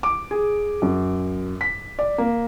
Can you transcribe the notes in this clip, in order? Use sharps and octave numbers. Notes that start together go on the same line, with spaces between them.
D6
G#4
F#2
B6
D5
A#3